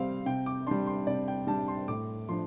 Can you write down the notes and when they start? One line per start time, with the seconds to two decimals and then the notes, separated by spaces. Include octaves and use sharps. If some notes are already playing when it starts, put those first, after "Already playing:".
Already playing: C3 G3 C4 F5
0.26 C3 G5
0.46 D6
0.66 G3 D4 C6
0.87 C6
1.07 C3 D5
1.28 G5
1.47 G3 D4 A5
1.68 C6
1.88 A2 D6
2.29 F3 D4 C6